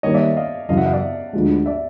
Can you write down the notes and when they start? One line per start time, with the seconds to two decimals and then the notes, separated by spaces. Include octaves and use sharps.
0.03 D#3 G3 A#3 C#5 D#5
0.14 D5 E5
0.36 D#5 F5
0.69 F#2 C#3 E3 D#5 F5
0.77 E5 F#5
0.86 D#5 F5
0.93 D5 E5
1.33 D2 D3 F3 G#3
1.66 D5 E5